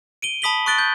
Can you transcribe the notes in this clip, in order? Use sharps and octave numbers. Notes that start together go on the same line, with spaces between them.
D7 D#7 G7
A5 B5 D#6 B6 F#7 G7
C#6 D#6 F#6 A6 D7 G7
G6